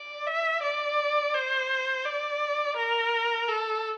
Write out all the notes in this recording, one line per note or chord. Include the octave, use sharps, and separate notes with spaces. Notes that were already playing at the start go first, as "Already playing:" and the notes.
Already playing: D5
E5
D5
C5
D5
A#4
A4